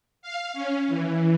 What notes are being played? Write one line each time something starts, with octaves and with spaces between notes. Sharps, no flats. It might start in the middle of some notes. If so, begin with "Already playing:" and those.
F5
C#4
E3